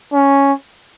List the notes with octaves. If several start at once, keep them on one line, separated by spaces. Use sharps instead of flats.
C#4